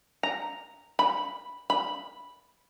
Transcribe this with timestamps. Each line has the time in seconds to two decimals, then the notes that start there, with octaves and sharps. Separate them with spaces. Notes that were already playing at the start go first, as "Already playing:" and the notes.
0.23 A#5
0.99 B5
1.70 B5